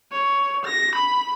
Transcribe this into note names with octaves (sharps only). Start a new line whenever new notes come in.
C#5
A#6
B5